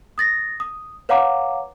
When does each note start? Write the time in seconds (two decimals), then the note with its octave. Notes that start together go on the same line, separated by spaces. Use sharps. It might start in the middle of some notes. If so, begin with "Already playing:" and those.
0.18 D#6 A6 A#6
0.60 D#6
1.09 B4 C#5 F5 F#5 A#5 D6